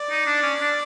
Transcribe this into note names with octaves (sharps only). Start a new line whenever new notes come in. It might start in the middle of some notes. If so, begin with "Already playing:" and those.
Already playing: D5
D#4
D4
C#4
D4